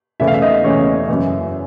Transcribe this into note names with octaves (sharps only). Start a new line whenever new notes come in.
E2 C#3 E3 A3 E4 E5
F5
E5
D#4 D#5
E2 C#3 E3 A3 C#4 C#5
F#2 C#3 E3